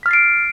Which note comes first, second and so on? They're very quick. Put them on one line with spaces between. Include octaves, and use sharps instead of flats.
B6 F6 A6 C7 D7